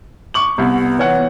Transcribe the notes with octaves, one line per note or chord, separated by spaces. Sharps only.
C#6 D6 F#7
C2 B3
E3 C#5 F#5